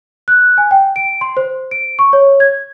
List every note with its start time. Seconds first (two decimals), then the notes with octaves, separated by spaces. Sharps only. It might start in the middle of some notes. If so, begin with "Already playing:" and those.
0.28 F#6
0.58 G#5
0.71 G5
0.96 D7
1.21 C6
1.37 C5
1.71 D7
1.99 C#6
2.13 C#5
2.40 G#6